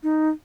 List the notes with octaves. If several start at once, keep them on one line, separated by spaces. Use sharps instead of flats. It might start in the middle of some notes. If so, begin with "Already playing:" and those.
D#4